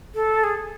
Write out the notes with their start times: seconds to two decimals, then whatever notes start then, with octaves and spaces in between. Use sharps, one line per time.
0.15 A4
0.43 G#4